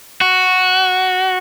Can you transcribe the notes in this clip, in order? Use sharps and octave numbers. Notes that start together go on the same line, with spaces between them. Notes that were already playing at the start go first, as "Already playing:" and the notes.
F#4